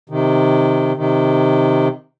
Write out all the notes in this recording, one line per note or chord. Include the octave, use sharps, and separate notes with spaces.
C3 D#3
C3 D#3